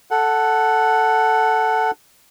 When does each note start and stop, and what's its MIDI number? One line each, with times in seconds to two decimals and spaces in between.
0.11 1.91 69
0.11 1.91 78